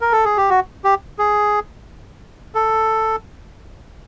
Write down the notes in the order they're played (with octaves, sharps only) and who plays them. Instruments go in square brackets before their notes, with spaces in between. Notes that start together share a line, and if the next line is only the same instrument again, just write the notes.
[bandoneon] A#4
A4
G#4
G4
F#4
G4
G#4
A4